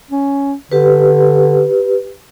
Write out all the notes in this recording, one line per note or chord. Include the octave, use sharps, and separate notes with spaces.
C#4
D3 G4 B4